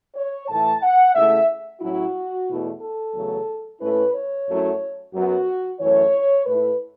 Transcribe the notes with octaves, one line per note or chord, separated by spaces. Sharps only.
C#5
A2 E3 A3 A5
F#5
C#3 A3 E4 E5
A2 F#3 C#4 E4 F#4
E2 B2 A3 E4
A4
E2 C#3 F#3 A3
A2 A3 C#4 E4 B4
C#5
F#2 F#3 A3 C#4 E4
F#2 F#3 B3 F#4
F#2 E3 A3 C#5
A2 A3 E4 B4